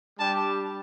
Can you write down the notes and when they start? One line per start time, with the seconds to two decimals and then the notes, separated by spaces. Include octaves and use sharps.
0.19 G3 D4 G4 A5